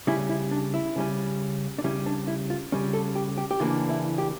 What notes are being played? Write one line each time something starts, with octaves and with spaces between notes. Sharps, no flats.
C#3 G3 C#4 E4
E4
D4
E4
C#3 G3 C#4
D4
C#3 G3 C#4 E4
D4
E4
F4
C#3 G3 C#4
A4
G4
G4
G4
C#3 E3 A#3 D4 F4
E4
G4